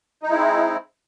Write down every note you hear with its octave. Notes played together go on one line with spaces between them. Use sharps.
G#3 C4 D#4 E4